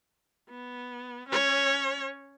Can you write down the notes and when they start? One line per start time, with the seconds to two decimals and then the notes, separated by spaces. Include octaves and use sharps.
0.50 B3
1.29 C#4 C#5